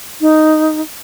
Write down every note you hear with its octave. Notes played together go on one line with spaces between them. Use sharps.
D#4